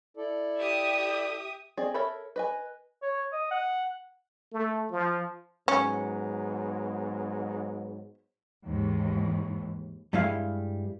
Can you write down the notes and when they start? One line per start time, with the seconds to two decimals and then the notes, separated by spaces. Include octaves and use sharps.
0.17 E4 A4 D5
0.57 G4 E5 D#6
1.77 C4 G#4 D5 D#5
1.94 A4 A#4 C#5 E5 B5
2.36 B4 D#5 G#5
3.02 C#5
3.32 D#5
3.51 F#5
4.52 A3
4.92 F3
5.68 G#2 F#3 B3 C#4
8.66 D#2 G#2 E3
10.13 G2 G3 G#3 E4 F5